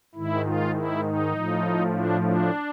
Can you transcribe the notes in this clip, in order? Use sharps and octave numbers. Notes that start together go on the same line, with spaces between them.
G#2 D#3 E4
F4
E4
D#4
A2 F3
D4
D4